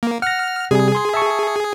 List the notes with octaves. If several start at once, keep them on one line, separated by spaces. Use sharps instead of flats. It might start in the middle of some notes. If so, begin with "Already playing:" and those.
A#3
F#5 F6 A#6
C3 G3 G#4
C6
E5 A5 C#6